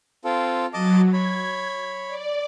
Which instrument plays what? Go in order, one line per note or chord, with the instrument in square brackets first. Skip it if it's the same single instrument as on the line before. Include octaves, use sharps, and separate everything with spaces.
[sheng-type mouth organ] C4 F4 A4
[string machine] F#3 [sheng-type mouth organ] D#5 A5 D6
[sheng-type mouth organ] C#5 B5 [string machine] G#6
[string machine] D5